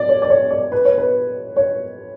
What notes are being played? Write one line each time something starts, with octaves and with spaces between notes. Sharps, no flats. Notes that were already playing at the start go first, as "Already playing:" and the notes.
Already playing: D5
C#5
D5
C#5
D5
B4
C#5
B4
C#5